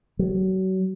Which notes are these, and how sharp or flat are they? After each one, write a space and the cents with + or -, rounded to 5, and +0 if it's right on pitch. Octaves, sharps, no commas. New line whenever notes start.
F#3 +30